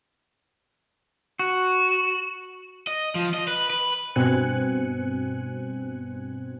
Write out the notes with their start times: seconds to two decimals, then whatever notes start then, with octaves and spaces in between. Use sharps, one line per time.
1.39 F#4
2.87 D#5
3.15 F3
3.34 D#5
3.47 B4
3.70 B4
4.16 G2 B2 C4 G#5 F#6 C#7